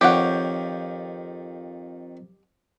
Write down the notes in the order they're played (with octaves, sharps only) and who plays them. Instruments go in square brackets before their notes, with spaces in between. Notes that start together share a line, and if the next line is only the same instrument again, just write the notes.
[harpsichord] F2 D#3 [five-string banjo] G4 C#5 F#5